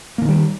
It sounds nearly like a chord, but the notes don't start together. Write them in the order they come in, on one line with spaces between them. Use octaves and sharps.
A#3 D3 D#3 G3